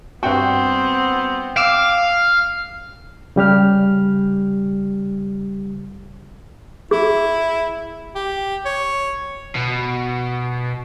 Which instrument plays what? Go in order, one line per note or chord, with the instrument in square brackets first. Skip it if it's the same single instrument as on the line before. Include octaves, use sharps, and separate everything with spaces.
[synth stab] G2 F#4 [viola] B3 C4 [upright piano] G5
[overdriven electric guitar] F5 [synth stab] D6 E6
[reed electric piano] C#3 G3 G4 F6
[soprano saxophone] E4 [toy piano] G#4
[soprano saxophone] G4
C#5
[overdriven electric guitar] B2